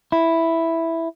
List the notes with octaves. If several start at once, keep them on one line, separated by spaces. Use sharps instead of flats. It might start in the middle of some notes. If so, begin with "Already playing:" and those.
E4